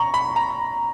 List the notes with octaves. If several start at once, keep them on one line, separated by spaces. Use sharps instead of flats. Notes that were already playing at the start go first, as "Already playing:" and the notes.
Already playing: A#5 C#6
B5
A#5